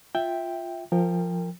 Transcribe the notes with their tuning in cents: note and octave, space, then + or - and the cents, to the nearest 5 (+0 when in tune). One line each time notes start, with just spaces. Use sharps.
F4 +0 E5 +0 G5 +0
F3 +0 A#4 -20 G5 +20